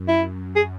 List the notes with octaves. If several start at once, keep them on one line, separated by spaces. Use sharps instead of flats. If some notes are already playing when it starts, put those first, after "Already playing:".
Already playing: F#2
E4
F#2
G#4